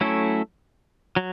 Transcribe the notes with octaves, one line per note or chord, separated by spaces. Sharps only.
F#3 A3 C#4 E4 A4
F#3